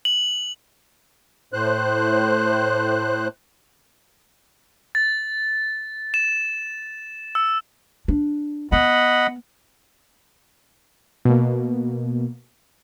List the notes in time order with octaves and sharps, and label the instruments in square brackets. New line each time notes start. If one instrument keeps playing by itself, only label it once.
[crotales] F#7
[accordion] A2 C5 F#6
[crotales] A6
E7
E6
[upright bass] D4
[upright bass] B3 [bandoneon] D#5 F#5 B5
[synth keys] B2 A#3